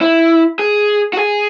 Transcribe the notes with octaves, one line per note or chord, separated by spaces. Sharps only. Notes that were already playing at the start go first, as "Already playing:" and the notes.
E4
G#4
F#4
G#4